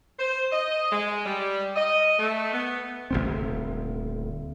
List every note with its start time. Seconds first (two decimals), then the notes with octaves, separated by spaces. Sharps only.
0.19 C5
0.52 D#5
0.92 G#3
1.26 G3
1.76 D#5
2.19 A3
2.52 B3
3.11 D#1 G#1 D2 C4